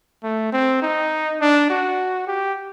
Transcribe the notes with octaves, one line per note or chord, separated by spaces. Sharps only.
A3
C4
D#4
D4
F#4
G4